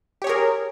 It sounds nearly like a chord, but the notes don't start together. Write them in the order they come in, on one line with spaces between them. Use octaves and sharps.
G4 C#5 G#4 A#4